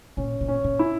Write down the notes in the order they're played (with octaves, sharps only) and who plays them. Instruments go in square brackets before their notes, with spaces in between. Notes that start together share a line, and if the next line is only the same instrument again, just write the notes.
[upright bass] A#2 [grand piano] C#4
[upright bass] A#2
[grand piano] C#4
[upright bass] A#2
[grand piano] E4